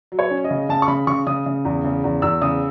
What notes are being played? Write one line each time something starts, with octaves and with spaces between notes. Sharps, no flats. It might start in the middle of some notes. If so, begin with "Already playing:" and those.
F#3
C#5
C#4
D#5
C#3
C#3 A5
C#6
C#3 B5
C#3 C#6
C#3 D#6
C#3
E2
C#3
E2
E2 E6
C#3 D#6